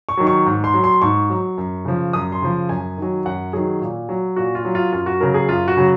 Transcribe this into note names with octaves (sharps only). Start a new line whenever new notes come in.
C#6
D#3 F#3
C#6
G#2
C6
F#3
C6
G#2 C#6
F#3
F#2
C#3 F3
F#2 D#6
C6
C#3 F3
F#2 G#5
D#3 F#3
F#2 F#5
D#3 F#3 G#4
A#2
F#3
A#2 F#4
F4
F#3
F4
F#2 F4
F#4
C#3 F#3 A#4
G#4
F#2 F4
F#4
C#3 F#3